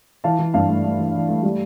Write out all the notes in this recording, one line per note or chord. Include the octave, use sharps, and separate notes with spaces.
E3 F5 A5
E3
G2 F5 A5
A3
A3
E3
E3
A3
G3